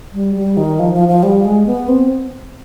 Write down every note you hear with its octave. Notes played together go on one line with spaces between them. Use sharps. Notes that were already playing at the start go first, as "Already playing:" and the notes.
G3
G3
D#3
F3
F3
F3
G3
G#3
B3
C4